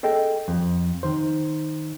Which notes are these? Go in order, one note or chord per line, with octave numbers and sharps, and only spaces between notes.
G#4 A4 D#5 G5
F2
D#3 C5